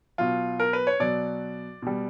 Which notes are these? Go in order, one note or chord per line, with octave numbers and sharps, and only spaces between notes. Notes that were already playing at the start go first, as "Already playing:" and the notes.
B2 F#3 F4
A#4
B4
C#5
B2 F#3 D5
B2 G3